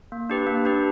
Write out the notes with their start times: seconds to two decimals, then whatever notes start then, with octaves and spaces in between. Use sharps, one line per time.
0.12 A#3
0.30 D4 G4 B4
0.47 A#3
0.65 D4 G4 B4